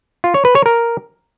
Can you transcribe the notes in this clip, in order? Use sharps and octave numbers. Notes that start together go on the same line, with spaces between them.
F4
C#5
B4
C#5
A#4